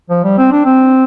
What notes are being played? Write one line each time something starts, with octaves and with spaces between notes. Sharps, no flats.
F3
G3
C4
D4
C4